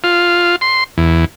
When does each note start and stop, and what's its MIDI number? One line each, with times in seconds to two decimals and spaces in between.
0.04 0.56 65
0.61 0.84 84
0.98 1.25 40